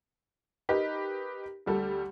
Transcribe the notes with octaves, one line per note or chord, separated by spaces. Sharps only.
D#4 G4 A#4 B4
D2 G3 A4